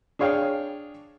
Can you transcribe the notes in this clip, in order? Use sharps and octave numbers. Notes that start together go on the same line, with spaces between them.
D4 G#4 C#5 F5 G5